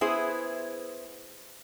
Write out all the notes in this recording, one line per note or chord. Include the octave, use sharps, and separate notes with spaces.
B3 E4 G#4 C5